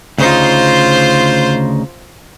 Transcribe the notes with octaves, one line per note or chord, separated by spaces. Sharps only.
D2 C#3 D#4 F4 C5